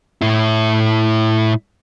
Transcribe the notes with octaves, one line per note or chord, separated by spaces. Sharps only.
A2 E4